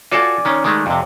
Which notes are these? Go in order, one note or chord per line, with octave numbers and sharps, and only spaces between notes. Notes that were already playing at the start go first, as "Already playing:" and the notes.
F4 F#4 A4 D5 G#5
D#3 C#4
D#3 G#3 A3
F2 C3